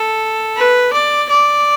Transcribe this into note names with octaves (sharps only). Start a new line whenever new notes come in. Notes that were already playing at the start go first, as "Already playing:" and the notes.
Already playing: A4
B4
D5
D5